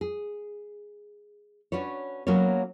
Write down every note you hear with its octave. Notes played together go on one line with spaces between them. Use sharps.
G#4
C#4 D4 F#4 B4 C#5
F#3 A#3 B3 C#4 C#5